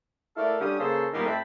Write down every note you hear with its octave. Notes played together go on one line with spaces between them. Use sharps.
A3 E4 A4 A#4 D5 F5
D3 G3 C#4 G4 D#6
C#3 A#3 G#4 A4 C5
A#2 D#3 F#3 G3 A#3 B3
F2 A3 C4 G5 A5 B5